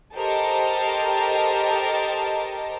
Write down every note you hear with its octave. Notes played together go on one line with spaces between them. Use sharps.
G4 A4 A#4 C5 D#5 A5